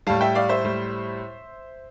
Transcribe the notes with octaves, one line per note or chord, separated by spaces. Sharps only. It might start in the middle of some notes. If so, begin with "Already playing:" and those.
A2 G3 F5 A5
E5 G5
D5 F5
C5 E5
A2 G3